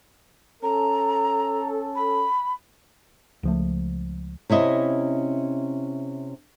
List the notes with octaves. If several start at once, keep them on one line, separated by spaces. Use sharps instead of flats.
C#4 A4 A#5
B5
C#2 F3 A3
C3 C#4 E4 D#5